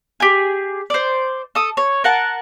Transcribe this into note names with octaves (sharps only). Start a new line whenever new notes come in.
G4 G#4
C5 D5
A4 D#6
C#5
A#4 F#5 A5